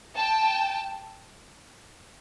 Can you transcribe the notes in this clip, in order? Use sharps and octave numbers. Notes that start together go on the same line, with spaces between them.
G5 A5